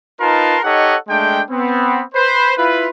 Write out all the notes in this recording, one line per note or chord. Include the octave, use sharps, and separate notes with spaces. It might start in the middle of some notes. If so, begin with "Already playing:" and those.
D#4 F4 A#4 B4 A5 C6
D#4 G4 A4 C#5 D#5 F#5
G#3 A3 D4 G5
B3 C4
B4 C5
E4 F4 B4